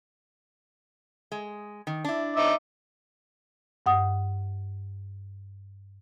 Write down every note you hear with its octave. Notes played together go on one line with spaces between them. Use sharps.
G#3
D#3
D4 E4
D#4 E5 D6
G2 F#5 D#6